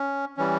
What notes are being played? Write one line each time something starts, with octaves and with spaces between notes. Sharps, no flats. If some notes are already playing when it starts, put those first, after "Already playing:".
Already playing: C#4
E3 G3 C#4